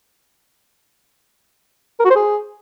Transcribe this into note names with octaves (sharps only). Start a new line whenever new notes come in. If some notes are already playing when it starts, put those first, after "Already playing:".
A#4
F#4
C5
G#4